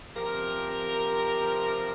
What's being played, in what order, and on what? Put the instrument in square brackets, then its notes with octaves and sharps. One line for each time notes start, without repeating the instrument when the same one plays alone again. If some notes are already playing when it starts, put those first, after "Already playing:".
[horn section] C3 F3 G4 A#4